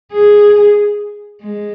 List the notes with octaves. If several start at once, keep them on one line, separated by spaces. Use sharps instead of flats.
G#4
G#3